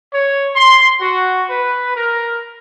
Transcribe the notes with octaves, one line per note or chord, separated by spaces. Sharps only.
C#5
C6
F#4
B4
A#4